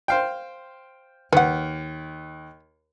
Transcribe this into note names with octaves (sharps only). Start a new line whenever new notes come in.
C5 F5 G5
D#2 B4 F#5